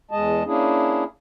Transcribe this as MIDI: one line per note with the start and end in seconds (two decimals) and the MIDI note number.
0.11 0.43 40
0.11 0.43 56
0.11 0.43 75
0.11 0.43 81
0.46 1.04 58
0.46 1.04 61
0.46 1.04 62
0.46 1.04 64
0.46 1.04 68